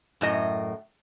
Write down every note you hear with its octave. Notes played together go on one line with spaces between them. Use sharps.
F#2 A2 D#5